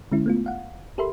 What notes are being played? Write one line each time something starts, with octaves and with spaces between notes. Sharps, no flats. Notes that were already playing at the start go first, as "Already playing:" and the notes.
D3 G#3 C#4 E4
A3 B3 F4
F5 F#5
G4 A4 A#4 E5 B5 C6